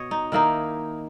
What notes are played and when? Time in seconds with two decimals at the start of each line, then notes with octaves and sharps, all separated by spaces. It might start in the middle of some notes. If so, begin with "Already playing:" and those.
Already playing: B2 C#5 D#5
0.11 D#4
0.32 D#3 A#3 D#4 E4